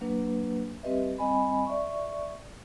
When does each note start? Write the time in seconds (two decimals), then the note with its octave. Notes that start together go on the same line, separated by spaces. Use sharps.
0.01 F#3 A#3 D4 B4
0.83 G3 C4 G4 B4 D#5 E5
1.19 G3 C4 D#5 G#5 B5
1.66 D5 E5 C#6